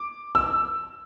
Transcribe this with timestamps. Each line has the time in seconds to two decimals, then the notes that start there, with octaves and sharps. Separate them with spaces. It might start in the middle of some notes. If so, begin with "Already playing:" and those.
Already playing: D6
0.35 E6